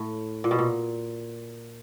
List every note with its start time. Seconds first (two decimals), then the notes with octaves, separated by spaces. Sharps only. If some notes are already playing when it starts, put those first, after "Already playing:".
Already playing: A2
0.44 A#2
0.51 B2
0.59 A#2